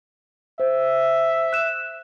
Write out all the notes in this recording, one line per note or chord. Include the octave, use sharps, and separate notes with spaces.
C5 E5
F#6 E7